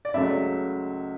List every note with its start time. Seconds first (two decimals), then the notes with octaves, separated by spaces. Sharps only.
0.05 D5
0.14 C#2 C#3 F#3 A3 E5